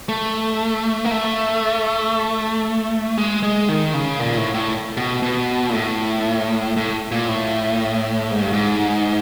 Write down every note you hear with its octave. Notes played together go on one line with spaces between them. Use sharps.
A3
A#3
A3
G#3
G#3
D#3
C#3
A#2
A2
A2
B2
B2
A#2
A2
A2
A#2
A2
G#2
G2
G#2